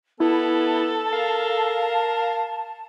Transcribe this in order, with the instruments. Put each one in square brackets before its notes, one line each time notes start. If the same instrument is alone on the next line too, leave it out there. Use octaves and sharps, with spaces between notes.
[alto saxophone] B3 [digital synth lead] E4 [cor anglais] A4 [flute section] A5
[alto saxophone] A#4 [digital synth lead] F5